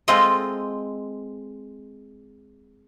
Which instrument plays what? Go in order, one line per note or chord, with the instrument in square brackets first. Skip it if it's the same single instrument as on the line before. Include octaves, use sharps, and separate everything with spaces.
[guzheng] G#3 C4 F4 A4 D#5